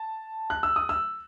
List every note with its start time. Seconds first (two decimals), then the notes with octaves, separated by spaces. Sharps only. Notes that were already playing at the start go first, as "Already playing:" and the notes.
Already playing: A5
0.50 F#6
0.63 E6
0.76 D#6
0.89 E6